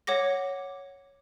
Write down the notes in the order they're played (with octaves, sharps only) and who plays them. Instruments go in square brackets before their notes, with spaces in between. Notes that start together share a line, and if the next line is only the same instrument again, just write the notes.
[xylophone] C#5 F#5 D6 A#6